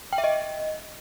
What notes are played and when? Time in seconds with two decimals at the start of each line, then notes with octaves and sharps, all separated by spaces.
0.13 G5
0.18 E5
0.24 D#5